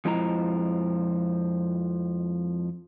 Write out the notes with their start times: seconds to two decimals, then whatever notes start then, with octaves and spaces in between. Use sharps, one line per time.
0.05 F2 F3 G#3 E4 D#5 A#5